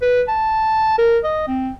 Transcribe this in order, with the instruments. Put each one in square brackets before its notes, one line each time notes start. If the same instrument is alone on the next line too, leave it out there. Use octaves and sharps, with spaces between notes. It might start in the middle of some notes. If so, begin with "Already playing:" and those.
[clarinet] B4
A5
A#4
D#5
C4